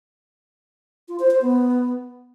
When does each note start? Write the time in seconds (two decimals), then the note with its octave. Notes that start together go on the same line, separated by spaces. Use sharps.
1.08 F4
1.19 C5
1.31 C5
1.42 B3